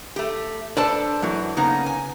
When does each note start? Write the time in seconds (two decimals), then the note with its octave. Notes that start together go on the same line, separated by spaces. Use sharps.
0.16 A3 G4
0.77 D4 A4 B4 C5 D5 A5
1.22 F#2 E3 F#3
1.57 C#3 A#3 B3 D#4
1.86 G#5